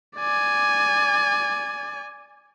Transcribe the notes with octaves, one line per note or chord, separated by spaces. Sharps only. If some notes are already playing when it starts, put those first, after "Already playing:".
D5 G#5